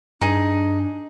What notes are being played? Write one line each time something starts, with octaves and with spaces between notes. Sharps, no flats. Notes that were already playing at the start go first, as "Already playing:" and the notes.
G2 D4 D#4 G#4